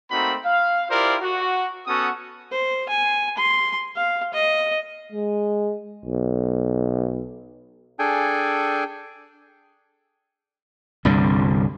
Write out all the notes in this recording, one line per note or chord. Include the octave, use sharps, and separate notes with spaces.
A3 A#3 C4 D#4 F#4 B5
F5
E4 F4 G4 A#4 C5 D5
F#4
B3 C#4 F#4 A4 F#5 D#6
C5
G#5
C6
F5
D#5
G#3
B1
D4 G#4 A4 G5 G#5
C2 G2 D3